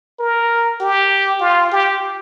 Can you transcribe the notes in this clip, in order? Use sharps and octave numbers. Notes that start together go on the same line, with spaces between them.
A#4
G4
F4
G4